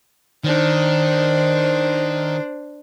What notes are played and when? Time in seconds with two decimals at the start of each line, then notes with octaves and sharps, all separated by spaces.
0.44 D#3 D4 C5